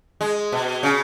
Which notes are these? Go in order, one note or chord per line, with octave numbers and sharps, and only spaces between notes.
G#3
B2
C#3